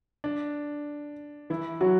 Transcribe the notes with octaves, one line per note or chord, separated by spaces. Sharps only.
D4
E3 E4
F#3 F#4